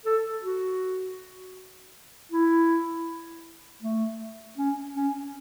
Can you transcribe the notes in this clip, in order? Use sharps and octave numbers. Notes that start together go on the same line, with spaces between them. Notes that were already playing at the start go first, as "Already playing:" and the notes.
A4
F#4
E4
A3
C#4
C#4